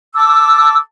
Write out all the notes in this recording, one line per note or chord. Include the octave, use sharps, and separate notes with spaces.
A5 D6 E6